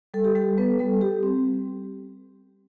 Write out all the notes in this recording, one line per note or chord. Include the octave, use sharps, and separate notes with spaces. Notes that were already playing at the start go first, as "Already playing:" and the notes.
G3 A4
G4
G3 A4
G3 B3 B4
G3 A4
G3 G4
C4